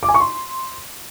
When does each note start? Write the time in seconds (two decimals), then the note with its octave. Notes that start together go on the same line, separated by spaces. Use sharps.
0.03 D6
0.09 G#5
0.14 C#6
0.20 C6